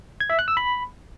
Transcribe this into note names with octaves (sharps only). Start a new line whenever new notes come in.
G#6
E5
F#6
E6
B5